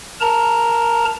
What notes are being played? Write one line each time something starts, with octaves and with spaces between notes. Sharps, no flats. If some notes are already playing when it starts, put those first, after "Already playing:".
A#4 A5 A#5